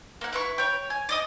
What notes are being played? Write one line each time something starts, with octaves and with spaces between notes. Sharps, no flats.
A#3 F#5
E4 B4 C#6
C#5 G5
G#5
D5 D#5 D#6